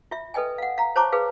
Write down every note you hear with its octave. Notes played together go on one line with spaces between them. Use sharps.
F4 E5
A4 B4 D#5 G5 G#5
F5 F#5
F5 A#5
C5 C#5 A5 A#5 C#6 D6
G#4 B4 F5